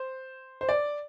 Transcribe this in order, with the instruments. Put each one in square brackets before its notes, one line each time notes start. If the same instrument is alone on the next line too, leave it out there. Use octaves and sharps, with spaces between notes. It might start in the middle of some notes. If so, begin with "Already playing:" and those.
Already playing: [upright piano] C5
C5
D5